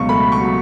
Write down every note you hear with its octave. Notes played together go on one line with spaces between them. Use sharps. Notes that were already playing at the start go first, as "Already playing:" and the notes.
Already playing: C#2 B2 F#3 C#6
A3 B5
C#6
F#3